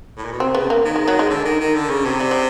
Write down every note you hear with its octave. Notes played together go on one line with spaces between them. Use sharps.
A2
A#2
B2
C3 C4
C#3 B3
A#3
D#3
G#3
F#3
G#3
D3
D#3
D#3
D3
C#3
C3
G3
G3